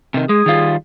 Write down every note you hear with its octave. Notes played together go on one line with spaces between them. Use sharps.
C3 D#3
G#3 G#4
D#3 G3 F4